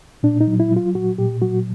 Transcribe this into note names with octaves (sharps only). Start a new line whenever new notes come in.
A#2 D4
D#4
F#3
E4
F#3
F4
A#2 F#4
A#2 G4
F#3 F#4